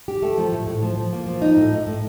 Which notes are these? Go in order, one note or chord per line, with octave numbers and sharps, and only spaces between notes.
G4
A3
F3
A2
A2
F3
F3
A#3
F3
D#4
A2
A2
A2